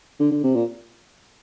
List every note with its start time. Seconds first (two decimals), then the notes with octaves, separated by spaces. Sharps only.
0.20 D3
0.32 D3
0.44 C3
0.55 A#2